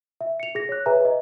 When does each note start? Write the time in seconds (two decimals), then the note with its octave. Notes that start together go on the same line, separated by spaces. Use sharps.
0.21 E5
0.40 C#7 F7
0.55 G#4 A#6
0.69 C#5 F#6
0.86 G#4 B4 C#5 E5 G#5 A#5
1.05 D#5